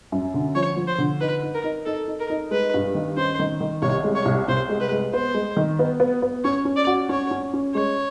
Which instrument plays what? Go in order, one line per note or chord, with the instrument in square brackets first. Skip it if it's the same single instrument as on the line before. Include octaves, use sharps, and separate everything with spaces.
[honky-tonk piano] F#2
D3
[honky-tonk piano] F3 [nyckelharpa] C#5
[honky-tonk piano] F3
[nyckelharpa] C5
[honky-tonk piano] D3
[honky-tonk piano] D#4 [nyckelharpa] B4
[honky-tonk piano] D#4
[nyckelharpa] A#4
[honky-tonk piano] D#4
[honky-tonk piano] D#4 [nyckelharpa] A4
[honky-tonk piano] D#4
[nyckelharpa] A#4
[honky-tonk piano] D#4
[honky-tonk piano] G#3 [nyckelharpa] B4
[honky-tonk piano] G2
D#3
[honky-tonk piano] C#4 [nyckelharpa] C5
[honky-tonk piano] D#3
D#3
[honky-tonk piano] C2 [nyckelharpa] C#5
[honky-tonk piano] G#3
[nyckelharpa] C#5
[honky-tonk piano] C2
[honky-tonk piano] C2 [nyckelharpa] C5
[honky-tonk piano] G#3
[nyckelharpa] B4
[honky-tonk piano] G#3
[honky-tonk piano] B3 [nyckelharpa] C5
[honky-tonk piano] G#3
D#3
B3
B3
B3
[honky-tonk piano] C#4 [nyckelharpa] C#5
[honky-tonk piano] C#4
[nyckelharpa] D5
[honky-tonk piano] F#4
[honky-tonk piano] C#4 [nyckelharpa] C#5
[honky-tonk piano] C#4
C#4
[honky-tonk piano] G#3 [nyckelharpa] C#5